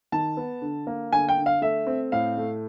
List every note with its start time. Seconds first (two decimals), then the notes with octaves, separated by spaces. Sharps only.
0.12 D#3 A5
0.37 B3
0.62 D3
0.87 A#3
1.12 D3 G#5
1.29 G5
1.38 D3
1.46 F5
1.62 A3 E5
1.87 C4
2.12 A2 F5
2.37 A3